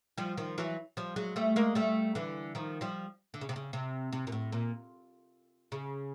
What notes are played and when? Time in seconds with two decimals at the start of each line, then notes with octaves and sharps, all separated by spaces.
0.18 F3 G3
0.37 D#3 F3
0.58 E3 F#3
0.97 F3 G3
1.16 F#3 G#3
1.36 G3 A3
1.56 G#3 A#3
1.75 G3 A3
2.15 D3 E3
2.55 D#3 F3
2.81 F3 G3
3.34 D3
3.41 C#3
3.49 C3
3.56 C#3
3.73 C3
4.12 C3
4.27 A#2
4.32 A2
4.52 A#2
5.72 C#3